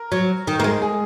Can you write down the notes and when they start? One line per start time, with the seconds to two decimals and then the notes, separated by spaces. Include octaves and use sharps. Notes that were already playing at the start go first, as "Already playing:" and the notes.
Already playing: A#4
0.12 F#3
0.47 D#3
0.60 A#3
0.64 G#3 A#4
0.82 G#4